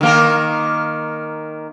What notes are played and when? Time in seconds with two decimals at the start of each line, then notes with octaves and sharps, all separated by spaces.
0.01 D#3 A#3 A#4